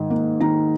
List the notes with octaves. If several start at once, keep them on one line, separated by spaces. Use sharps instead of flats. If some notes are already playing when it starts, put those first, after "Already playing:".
Already playing: G#2 D#3
A#3
D#3 A#5